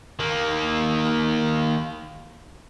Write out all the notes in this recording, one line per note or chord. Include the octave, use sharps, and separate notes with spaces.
D#3 A#3